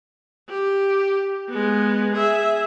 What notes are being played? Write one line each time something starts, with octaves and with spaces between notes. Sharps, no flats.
G4
G#3 B3
G#4 E5